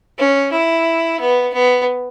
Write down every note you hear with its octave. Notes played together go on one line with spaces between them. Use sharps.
C#4
E4
B3
B3